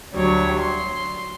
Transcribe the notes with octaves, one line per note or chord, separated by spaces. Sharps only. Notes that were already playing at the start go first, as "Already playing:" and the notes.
D2 F#3 G3 C#5
C6